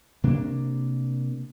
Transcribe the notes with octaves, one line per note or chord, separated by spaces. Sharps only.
C3 A#3 D4